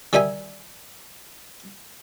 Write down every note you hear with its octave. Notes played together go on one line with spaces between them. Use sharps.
D#3 G3 D#4 E5 G#5